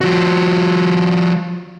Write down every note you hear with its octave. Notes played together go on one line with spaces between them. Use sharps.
F3 F#4